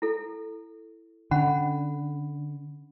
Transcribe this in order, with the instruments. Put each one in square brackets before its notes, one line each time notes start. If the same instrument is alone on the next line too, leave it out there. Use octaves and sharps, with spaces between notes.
[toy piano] E4 A4
[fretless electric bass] D3 [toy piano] C#4 F#5 B5